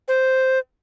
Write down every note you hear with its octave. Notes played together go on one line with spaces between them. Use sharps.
C5